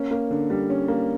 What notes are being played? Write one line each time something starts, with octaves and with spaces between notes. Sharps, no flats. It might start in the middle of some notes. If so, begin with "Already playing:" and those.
Already playing: A#3 C#4
A#3
D3
G3
C#4
A#3